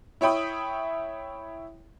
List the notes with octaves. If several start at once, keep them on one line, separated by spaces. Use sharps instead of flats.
E4 C#5 E5 G5 B5 D#6